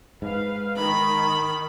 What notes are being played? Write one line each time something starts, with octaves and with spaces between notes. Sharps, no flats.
G#2 B4 F5
D#3 B5